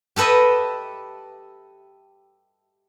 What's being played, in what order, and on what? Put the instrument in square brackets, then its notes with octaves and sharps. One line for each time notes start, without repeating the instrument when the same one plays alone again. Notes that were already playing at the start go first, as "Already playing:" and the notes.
[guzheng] G4 A4 B4 D#5 E5